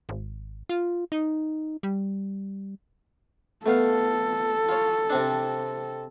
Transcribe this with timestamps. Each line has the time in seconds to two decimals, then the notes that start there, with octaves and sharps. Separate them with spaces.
0.09 G#1
0.69 F4
1.12 D#4
1.83 G3
3.66 A3 B3 A4 F5
4.69 F4 C#5
5.10 C3 C4 D4